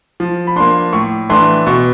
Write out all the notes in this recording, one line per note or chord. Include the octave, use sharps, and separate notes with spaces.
F3
B5
A#3 D4 C6
A2 C#6
E3 A3 D4 C6
B2 C#6